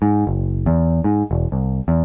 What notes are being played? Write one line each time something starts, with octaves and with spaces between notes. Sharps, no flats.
G#2
F#1
E2
G#2
E1
C2
E2